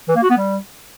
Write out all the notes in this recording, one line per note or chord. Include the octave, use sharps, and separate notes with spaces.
E3
A#3
F#4
B3
G3